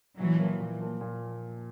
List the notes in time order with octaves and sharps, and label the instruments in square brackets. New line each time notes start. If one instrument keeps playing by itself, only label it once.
[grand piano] A#2 [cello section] E3 F#3
[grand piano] F3 A#3
A#2
F3 A#3
A#2